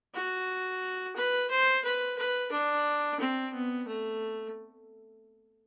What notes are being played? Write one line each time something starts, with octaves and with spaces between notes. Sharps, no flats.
F#4
B4
C5
B4
B4
D4
C4
B3
A3